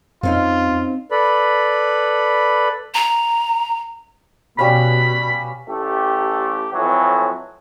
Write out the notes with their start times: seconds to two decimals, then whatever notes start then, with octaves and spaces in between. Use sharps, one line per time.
0.23 F2 C4 C#4 D#4 F4
1.11 A4 B4 D5 B5
2.94 A#5
4.59 B2 G3 C#4 F5 B5
5.68 A1 A3 G4
6.74 F2 A2 E3 F#3